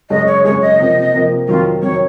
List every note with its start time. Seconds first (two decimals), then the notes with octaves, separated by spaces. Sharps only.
0.10 F#2 C#3 G#3 C#4 G#4 D#5
0.27 C#5
0.44 F#2 C#3 G#3 C#4 G#4 C#5
0.61 D#5
0.80 C3 F3 A#3
1.14 C3 F3 A#3
1.48 F2 D#3 F#3 F4
1.83 F2 D#3 F#3 C#5